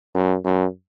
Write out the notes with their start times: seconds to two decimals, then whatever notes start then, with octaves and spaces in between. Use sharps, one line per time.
0.15 F#2
0.44 F#2